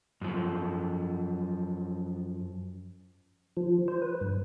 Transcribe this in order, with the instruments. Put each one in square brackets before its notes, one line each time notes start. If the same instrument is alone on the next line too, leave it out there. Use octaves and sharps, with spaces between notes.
[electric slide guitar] F#2 F3
[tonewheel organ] F3
C5
B4
G2